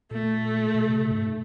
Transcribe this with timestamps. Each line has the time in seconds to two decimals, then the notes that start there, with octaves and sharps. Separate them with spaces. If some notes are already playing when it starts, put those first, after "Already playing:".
0.11 A#2 A3
0.75 B2
0.89 C3
1.06 A#2
1.11 G2
1.16 G#2